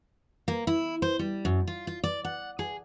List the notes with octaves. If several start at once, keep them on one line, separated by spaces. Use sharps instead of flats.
A#3
E4
C5
G3
F#2
F4
F4
D5
F#5
G#4